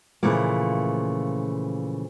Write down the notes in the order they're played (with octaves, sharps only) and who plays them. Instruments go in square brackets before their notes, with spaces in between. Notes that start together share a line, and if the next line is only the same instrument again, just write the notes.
[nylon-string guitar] A#2 C#3 E3 F3 A3 A#3